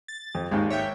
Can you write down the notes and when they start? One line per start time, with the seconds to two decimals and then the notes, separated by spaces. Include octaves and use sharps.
0.08 A6
0.35 F2
0.51 G#1 D#2 G#3
0.70 C#5 E5 G5